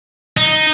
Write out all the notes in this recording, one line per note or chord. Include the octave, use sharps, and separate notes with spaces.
D#4